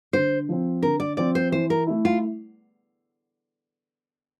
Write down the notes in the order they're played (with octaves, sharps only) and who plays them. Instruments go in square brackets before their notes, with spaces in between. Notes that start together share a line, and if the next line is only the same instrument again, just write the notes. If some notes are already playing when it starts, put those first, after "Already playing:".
[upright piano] D3 [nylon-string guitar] C5
[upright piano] F3 C4
[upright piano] D3 [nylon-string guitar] A#4
[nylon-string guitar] D5
[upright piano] F3 C4 [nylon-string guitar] D5
[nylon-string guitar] C5
[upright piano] E3 [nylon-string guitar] C5
[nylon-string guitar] A#4
[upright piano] A3 E4
[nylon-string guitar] F4